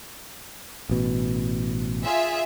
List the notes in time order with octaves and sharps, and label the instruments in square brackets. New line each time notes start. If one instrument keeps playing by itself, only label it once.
[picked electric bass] A1 B2
[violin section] F4 G#4 E5